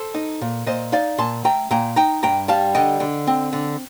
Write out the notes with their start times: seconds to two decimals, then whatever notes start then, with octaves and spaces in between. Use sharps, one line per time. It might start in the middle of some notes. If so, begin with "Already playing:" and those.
Already playing: A4 C5
0.15 D#4
0.41 A#2
0.66 A#2 C5 D#5
0.92 D#4 D5 F5
1.18 A#2 A5 C6
1.44 A3 G5 A#5
1.71 A#2 G5 A#5
1.96 D#4 G5 A#5
2.23 G2 G5 A#5
2.48 G3 F5 A5
2.75 D3 D#5 G5
3.00 D3
3.27 C4
3.53 D3